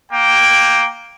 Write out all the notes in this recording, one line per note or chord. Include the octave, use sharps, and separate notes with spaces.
A#3 G5